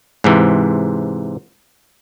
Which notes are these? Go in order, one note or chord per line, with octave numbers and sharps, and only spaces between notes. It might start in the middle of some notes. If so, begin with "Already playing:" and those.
G#2 C3 E3